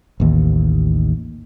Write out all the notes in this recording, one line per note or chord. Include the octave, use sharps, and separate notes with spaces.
A1 D#2